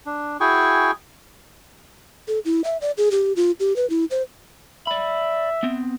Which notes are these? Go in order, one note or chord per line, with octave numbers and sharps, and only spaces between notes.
D4
E4 F#4 G#4 G5 G#5 C#6
A4
E4
E5
D5
G#4
G4
F4
G4
B4
E4
C5
D5 E5 B5
B3 C4